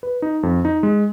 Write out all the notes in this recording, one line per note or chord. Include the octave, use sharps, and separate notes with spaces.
B4
D#4
F2
D#4
G#3